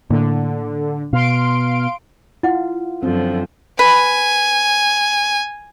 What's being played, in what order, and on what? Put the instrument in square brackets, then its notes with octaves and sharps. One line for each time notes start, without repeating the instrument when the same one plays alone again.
[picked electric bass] A2 A#3 [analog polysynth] D3
[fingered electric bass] B2 [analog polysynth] F5 C6 D7
[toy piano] E4 F#5 [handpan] F4
[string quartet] F#2 D3 F3 [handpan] C4
[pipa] B4 [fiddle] G#5